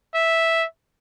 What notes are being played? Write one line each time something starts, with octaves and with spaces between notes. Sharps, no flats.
E5